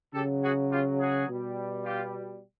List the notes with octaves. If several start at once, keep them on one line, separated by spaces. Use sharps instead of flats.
C#3 F#3 G4 A4
F#4 G#4
F4 G4
F#4 G#4
B2 G3
F4 G4